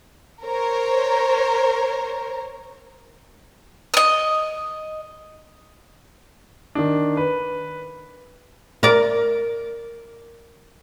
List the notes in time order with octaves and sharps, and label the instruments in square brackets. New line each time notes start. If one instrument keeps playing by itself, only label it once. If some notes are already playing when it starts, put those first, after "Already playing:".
[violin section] A#4 C5 C#5 A#5
[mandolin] D#5 D#6
[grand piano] D#3 D4
B4
[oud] A#4 D5